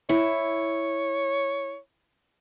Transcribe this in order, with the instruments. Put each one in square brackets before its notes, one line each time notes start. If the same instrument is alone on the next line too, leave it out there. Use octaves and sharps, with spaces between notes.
[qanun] E4 [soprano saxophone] C#5